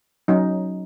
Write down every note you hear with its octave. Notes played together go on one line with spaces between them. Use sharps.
F#3 C#4 D#4